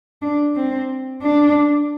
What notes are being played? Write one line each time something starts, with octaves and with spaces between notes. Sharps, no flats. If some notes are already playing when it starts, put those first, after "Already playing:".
D4
C4
D4